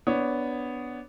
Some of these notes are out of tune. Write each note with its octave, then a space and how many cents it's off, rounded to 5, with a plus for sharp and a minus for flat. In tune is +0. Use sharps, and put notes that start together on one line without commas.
B3 +0 D4 -10 C#5 +0